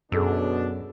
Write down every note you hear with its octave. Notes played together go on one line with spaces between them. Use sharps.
F#2 B2 D4 G#4 A4 E6